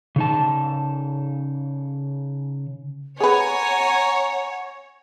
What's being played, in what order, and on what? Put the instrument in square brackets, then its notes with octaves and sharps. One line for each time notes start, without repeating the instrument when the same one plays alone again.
[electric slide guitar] C#3 D#4 A5
[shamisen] G#4 B4 [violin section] C#5 [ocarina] F#5 [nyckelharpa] G#5 A#5